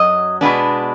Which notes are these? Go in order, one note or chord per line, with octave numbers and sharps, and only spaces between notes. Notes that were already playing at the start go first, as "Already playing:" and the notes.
Already playing: F#2 F#3 D#5
B2 G#3 B3 D4